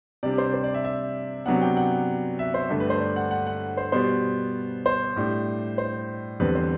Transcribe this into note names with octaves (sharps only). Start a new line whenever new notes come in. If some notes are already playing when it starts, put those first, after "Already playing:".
C3 G3 D4 D5
C5
C5
D5
E5
E5
C3 F#3 B3 D4 F#5
G5
F#5
E5
C5
G2 D3 A3
B4
C5
D5
F#5
F#5
F#5
C5
B2 G3 B3 C5
C5
A2 G3 D4
C5
E2 D3 G3 C4 B4
C5